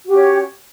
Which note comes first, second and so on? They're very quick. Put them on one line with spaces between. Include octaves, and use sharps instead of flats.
F#4 G4 C#4 C#5